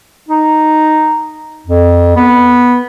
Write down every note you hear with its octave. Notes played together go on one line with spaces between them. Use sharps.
D#4
F2
B3